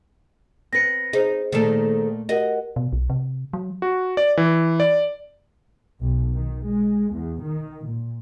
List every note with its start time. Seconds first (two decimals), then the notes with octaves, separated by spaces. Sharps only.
0.73 C4 B4 A#6 C#7
1.13 D#4 G#4 C5
1.52 A#2 D#3 A3 A#3 A4
2.29 F#4 G4 A#4 D#5 F#5
2.76 B2
2.93 B1
3.10 C3
3.53 F#3
3.82 F#4
4.17 D5
4.37 E3
4.80 D5
6.00 B1
6.34 D#3
6.66 G#3
7.15 E2
7.43 D#3
7.87 A#2